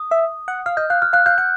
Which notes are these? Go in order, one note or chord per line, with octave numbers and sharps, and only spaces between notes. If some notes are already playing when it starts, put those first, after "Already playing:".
Already playing: D#6
E5
F#5
F5 F6
D#5 G6
F5 F#6
F6
F5 F#6
F5 G6
F#5 G6